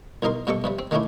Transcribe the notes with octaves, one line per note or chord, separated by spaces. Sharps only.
C2 B2 D#4 A#4 C6
G2 B2 G#3 A4 C#6
G2 C3 G3
C4
D#3 G#3 A3 C#4 D4 E4